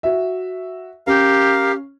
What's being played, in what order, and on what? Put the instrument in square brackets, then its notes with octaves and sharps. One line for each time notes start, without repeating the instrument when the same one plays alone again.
[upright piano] F#4 E5
[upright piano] C#4 [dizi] G4 [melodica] A#4 F5